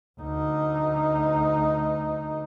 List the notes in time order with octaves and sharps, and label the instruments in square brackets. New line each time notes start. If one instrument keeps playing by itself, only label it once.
[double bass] D2 D#4